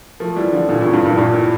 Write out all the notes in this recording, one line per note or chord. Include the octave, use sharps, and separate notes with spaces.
F3 A3
E3 G3
D3 F3
A#2 D3
A2 C#3
G2
G2 A#2
A2
G2 A#2
A2